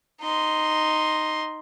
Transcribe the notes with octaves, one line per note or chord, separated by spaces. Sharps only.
D#4 C6